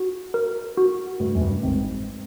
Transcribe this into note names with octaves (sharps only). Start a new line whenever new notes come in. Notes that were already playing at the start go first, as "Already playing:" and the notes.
Already playing: F#4
A#4
F#4
G2 A3
F#2
G2
G#1 G#2 C4